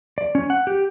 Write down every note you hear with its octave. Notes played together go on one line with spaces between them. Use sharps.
D5
C#4
F#5
G4